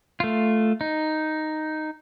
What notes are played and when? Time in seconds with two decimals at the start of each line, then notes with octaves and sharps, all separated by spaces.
0.20 A3 F4
0.81 D#4